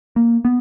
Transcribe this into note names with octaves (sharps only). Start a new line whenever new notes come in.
A#3
B3